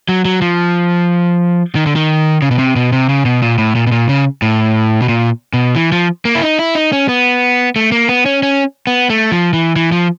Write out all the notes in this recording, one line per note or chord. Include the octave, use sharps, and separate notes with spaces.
F#3
F#3
F3
D#3
D3
D#3
C#3
B2
C3
B2
C3
C#3
B2
A#2
A2
A#2
B2
A#2
C#3
A2
B2
A#2
B2
E3
F3
A#3
E4
D#4
E4
D#4
C#4
B3
A3
A#3
B3
C#4
C#4
B3
A3
F3
E3
E3
F3